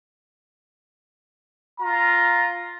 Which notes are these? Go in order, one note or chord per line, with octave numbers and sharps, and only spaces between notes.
F4 A#5